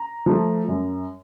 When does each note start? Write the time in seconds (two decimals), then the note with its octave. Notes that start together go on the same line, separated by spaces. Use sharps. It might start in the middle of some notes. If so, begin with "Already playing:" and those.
Already playing: A#5
0.26 F3 A3
0.68 F#2